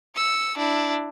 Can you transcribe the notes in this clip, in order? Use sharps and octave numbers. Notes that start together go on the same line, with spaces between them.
E6 C#7
D4 E4